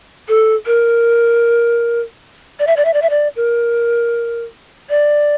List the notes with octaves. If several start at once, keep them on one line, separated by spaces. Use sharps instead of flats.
A4
A#4
D5
E5
D5
E5
D5
E5
D5
A#4
D5